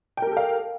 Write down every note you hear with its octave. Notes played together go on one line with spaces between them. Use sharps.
G4 A4 A#4 F5 G5